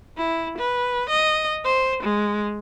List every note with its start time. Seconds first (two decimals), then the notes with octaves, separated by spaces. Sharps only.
0.18 E4
0.58 B4
1.09 D#5
1.65 C5
2.03 G#3